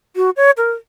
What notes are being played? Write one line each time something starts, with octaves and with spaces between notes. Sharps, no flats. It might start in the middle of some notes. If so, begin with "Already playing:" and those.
F#4
C#5
A#4